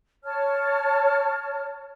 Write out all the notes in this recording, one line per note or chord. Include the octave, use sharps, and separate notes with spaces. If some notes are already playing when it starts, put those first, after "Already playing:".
C#5 A5 F6